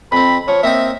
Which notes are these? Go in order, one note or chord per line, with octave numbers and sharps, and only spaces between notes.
F2 C4 B5
F3 C#5
A#3 C4 D#4 E5